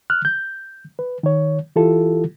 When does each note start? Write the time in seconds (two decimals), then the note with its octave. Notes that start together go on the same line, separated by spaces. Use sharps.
0.10 F6 F#6
0.25 G6
0.99 B4
1.23 D#3 C#5
1.76 E3 E4 F4 G4 A4